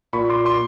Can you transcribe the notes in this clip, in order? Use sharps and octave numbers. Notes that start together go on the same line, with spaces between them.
A#2 B5 C#6
C6 D6
C6 D6